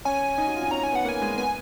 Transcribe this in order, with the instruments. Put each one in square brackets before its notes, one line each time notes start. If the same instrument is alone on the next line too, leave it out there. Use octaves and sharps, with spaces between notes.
[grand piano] C#4 [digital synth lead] G#5
[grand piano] D#4
F#4
F4
D#4
[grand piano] C#4 [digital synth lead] A#5
[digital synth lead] G#5
[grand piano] B3 [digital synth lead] F#5
[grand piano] A#3
[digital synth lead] G#5
[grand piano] G#3
[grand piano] B3 [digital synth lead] G#5